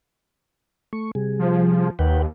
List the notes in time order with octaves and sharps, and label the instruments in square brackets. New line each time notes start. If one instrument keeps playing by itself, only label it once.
[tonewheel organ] A3 C#6
C3 G3 G#4
[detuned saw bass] F3
[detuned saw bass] D#2 [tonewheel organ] B4 F#5 G5